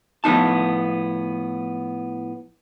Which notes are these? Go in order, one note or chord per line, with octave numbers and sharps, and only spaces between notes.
A2 F3 B3 D#4 A5